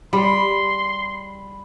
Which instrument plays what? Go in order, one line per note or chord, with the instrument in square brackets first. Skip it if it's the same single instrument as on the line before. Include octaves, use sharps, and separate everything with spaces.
[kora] G3 [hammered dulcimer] B5 [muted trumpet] C6